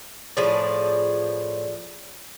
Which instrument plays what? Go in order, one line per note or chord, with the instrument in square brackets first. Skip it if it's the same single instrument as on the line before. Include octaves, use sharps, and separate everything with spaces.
[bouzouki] A2 F3 G#4 D5